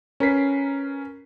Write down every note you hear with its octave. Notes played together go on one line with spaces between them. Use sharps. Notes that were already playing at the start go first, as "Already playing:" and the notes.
C#4 A#4 B4 B6 C7